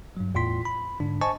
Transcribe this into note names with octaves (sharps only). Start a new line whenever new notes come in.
G2 F#3
E2 A2 F4 C6 B6
B5
G#2 D3 D4
C5 D#5 G#5 A5 C#6